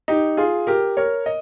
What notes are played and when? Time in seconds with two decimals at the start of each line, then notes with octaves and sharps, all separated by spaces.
0.08 D#4 G4
0.37 F4 G#4
0.67 G4 A#4
0.97 A#4 C#5
1.26 D#5